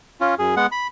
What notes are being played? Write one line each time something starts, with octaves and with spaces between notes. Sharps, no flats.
C#4 F4
F#2 G#4
G#3 B3 F#5
B5